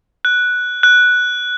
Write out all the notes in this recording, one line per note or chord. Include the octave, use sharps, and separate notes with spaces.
F#6
F#6